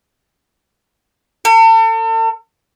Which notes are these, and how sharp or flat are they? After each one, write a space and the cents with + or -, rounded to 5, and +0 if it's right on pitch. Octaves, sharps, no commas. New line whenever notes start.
A4 +40